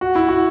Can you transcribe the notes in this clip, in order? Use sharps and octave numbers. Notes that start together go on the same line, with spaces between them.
F#4
E4
F#4